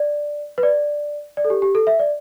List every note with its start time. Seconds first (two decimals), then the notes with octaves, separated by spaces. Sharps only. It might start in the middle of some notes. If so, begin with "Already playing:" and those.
Already playing: D5
0.58 B4
0.63 D5
1.37 D5
1.45 A4
1.50 G4
1.62 G4
1.75 A4
1.87 E5
1.99 D5